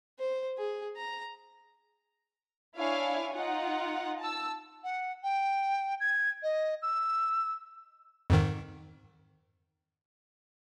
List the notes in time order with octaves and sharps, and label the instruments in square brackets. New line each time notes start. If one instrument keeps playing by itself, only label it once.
[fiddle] C5
G#4
A#5
[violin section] D4 E4 C#5 F5 G#5
D#4 F4 F#5
A5 E6
[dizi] F#5
G5
G#6
D#5
E6
[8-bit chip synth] F2 G#2 D#3